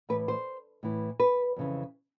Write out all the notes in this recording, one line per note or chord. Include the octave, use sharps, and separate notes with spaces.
A2 E3 B4
C5
A2 E3
B4
F2 C#3 E3